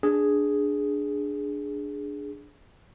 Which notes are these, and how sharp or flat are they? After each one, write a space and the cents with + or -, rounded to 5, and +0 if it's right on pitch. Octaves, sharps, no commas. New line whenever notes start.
D4 +0 G#4 +0